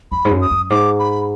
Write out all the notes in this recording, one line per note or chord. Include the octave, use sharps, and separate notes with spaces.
F2 B5
G#2
F#2
D#6
F#2
G#2 D6
B5